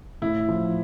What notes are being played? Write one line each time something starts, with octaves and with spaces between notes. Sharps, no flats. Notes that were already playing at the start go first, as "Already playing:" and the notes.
A2 E4
F3